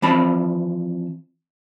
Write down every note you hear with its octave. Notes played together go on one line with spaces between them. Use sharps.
E3 F3 C4 A5 B5